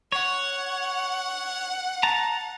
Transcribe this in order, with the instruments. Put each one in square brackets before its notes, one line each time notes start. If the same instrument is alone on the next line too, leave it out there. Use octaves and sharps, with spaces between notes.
[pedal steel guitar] C#5 [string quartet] F#5
[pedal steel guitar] A5 A#5